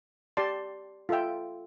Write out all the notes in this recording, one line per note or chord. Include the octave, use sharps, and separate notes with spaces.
G4 D5 A5 C6
F4 A4 E5 G5